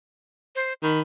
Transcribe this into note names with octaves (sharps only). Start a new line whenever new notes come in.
C5
D#3 B5